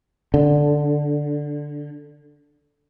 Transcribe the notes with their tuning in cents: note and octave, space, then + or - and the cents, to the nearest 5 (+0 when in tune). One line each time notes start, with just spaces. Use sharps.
D3 +0